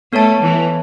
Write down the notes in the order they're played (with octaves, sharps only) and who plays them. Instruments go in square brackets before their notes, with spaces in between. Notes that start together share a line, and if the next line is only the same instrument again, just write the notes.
[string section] A3 [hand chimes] B3 A4 C#5 A5
[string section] E3